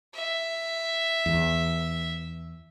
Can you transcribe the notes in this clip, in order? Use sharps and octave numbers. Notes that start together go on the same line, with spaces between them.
E5
E2